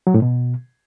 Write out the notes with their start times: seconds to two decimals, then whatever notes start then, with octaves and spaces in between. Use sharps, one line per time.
0.07 F#3
0.14 A2
0.22 B2